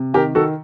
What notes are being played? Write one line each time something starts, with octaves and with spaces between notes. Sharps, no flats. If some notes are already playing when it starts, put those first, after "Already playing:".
Already playing: C3
D#3 G4 A#4
D#3 F#4 A4